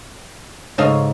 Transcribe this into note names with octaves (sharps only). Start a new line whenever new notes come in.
G#2 C#3 A4 C#5 D#5 F5